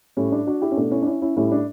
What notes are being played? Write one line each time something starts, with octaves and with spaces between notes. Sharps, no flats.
A2 G3 C#4
D4
D4 F#4
E4 G4
C#4
B2 A3 D4
C#4 E4
D4
C#4 E4
C#4 E4
A2 G3 C#4 E4
D4